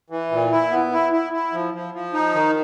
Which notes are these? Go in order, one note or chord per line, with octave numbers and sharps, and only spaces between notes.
E3
A#2
E4
B3
E4
E4
E4
F3
F3
F3
D#4
D#3